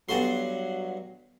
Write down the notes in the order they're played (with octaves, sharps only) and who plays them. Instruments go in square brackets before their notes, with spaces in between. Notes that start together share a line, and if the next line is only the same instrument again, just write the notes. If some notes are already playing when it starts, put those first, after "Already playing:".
[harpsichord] G2 F#4 C6 [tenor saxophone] F#3 [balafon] B3 A4